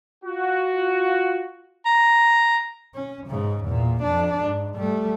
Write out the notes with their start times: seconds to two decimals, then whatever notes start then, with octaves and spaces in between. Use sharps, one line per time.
0.25 F4 F#4
1.85 A#5
2.95 C#4
3.28 G#2 C#3
3.65 E2 A#2
4.03 F2 D4
4.41 G#2
4.75 G3 A3